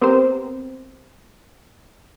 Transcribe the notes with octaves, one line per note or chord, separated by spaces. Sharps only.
B3 C4 G4 A#4 C5